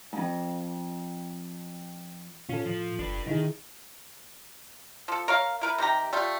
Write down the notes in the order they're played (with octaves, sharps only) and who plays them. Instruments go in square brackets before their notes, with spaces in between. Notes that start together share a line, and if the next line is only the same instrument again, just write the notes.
[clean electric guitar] F2 G#2
[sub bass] A2 [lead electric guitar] C#4 [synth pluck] F4 A4
[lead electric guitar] F3
[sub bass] F#1 [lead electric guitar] D4 B4
[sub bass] C3 [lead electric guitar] D#3 [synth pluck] D#4 E4 G#4
[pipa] F3 A4
A#4 C#5 F5
E4 A#4 B4
C3 D#3 G4 A#5
G3 A3 F4